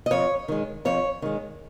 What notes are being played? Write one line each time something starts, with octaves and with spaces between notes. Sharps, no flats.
D#5
F2 C#5
D#3 G#3
F2 C#5
D#3 G#3